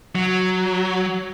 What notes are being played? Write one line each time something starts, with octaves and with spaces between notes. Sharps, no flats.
F#3